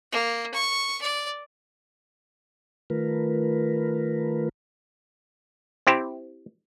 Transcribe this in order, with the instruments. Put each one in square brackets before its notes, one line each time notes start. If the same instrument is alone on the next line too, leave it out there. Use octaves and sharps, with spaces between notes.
[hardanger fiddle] A#3
C#6
D5
[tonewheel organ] D#3 A3 F4 A#4 B4
[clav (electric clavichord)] C4 E4 G4 C5